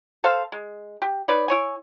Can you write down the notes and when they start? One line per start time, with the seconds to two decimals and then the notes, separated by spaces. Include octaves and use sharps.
0.24 A4 C5 F5
0.52 G#3
1.02 G4
1.28 D#4 B4 C#5 D5
1.48 E4 C#5 G#5